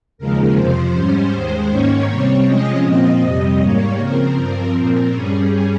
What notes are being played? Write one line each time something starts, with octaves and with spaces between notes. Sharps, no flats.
D#2 C#3 F3 G#3 A#4
F2 C3 F3 C5
G#2 G3 C#4
D#2 D#3 G#3
G#2 D#3 A#3 C#4 C#5
C3 G3 C4 C#5
C3 F3 G#3 C#4 D#5
A#2 F3 C4
F2 C3 G3 D#5
G#2 G3 A#3 C#5
C#3 F3 C4 A#4
G2 F3 C4
A#2 F3 C4 A#4
G2 G3 C#4 G#4